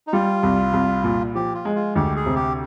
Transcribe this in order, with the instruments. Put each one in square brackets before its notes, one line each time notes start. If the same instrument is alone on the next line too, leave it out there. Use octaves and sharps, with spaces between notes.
[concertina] D#4
[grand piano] G3 [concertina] F4
[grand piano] C2
C2
A#2
[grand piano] F3 [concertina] G4
[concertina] F4
[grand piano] G#3
[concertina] F4
[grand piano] D2 [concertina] G4
[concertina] G#4
[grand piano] C3
[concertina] G4